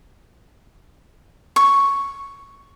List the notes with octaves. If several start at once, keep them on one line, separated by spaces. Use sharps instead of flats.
C#6